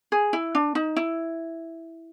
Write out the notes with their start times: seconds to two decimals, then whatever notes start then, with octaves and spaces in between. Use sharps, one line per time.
0.12 G#4
0.33 E4
0.55 D4
0.75 D#4
0.96 E4